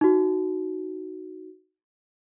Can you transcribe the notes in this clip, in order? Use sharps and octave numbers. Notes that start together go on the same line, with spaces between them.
D#4 F#4